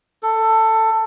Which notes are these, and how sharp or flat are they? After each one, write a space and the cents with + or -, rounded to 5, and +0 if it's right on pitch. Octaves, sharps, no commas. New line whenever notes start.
A4 +15